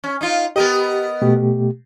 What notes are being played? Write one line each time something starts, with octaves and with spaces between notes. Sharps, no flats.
C#4
D#4 F4
B3 G4 A#4 D#5
B2 A3 G4